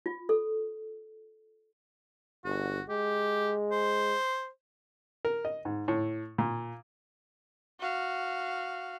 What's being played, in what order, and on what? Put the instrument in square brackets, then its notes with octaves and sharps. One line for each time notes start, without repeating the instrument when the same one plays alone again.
[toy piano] F4
A4
[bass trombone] G1 [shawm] F#4
[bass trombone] G#3 [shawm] G4
[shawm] C5
[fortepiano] A#4
D#5
G#2
A2
A#2
[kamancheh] F#4 F5